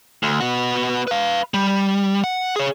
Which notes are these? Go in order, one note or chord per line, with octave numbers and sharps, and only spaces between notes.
D2
B3 F#4
B4 F5
G3
F#5
G#4 C#5